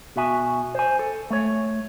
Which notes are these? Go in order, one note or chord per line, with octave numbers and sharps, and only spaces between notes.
B2 F#4 E5 G#5
C5 G#5
A4
A3 C#5